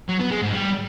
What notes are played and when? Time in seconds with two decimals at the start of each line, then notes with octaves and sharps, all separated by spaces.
0.08 F#3
0.20 B3
0.31 G#3
0.42 G#2
0.53 G3